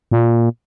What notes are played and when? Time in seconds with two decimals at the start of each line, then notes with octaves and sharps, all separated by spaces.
0.12 A#2